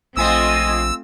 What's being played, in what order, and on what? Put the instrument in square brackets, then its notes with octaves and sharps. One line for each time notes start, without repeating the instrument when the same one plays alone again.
[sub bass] A#1 [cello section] A3 C4 F4 [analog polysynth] D#5 G#5 D#6 [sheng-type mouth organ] E6